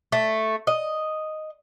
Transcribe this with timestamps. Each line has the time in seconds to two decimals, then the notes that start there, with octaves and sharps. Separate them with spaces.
0.12 A3
0.67 D#5